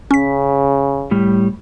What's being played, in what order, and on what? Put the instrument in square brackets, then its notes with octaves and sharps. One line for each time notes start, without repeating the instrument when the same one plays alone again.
[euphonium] C#3 [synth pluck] C#4 B6
[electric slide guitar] A2 G3